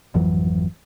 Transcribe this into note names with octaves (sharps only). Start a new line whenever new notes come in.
G#1 F2 E3 F#3